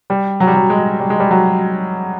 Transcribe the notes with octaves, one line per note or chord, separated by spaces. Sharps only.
G3
F#3
G3
F#3
G#3
G3
G#3
G3
F#3